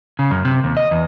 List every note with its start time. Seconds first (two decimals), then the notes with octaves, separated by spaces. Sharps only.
0.19 C#3
0.31 F#2
0.45 C3
0.64 D#2
0.77 D#5
0.91 E2